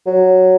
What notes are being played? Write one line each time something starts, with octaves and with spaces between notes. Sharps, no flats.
F#3